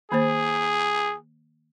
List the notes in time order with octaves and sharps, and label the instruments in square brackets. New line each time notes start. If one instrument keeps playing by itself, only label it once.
[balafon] D#3 A#3 C5 [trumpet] G#4